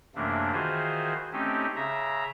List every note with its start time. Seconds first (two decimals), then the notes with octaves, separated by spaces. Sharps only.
0.15 F#2 C3 E3 A3 A#3 D4
0.52 D#3 E3 F4 F#4 G#4 C5
1.33 A3 C4 C#4 D#4 G4
1.76 C#3 E5 A#5